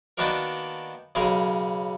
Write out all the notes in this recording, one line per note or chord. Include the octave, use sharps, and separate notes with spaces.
D#3 A#3 B3 D4 F#4 A#4
B1 C#3 G#4 A#4 C6